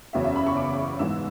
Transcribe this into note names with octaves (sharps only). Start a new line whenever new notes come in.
F#1 E2 C#3 F#3 C#4 E5
E5
B5
C#6
D6
G#2 E3 B3 E6